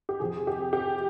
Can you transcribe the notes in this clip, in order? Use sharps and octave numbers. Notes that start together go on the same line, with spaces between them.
G4
F2 C3 F3 G#4
G4
G4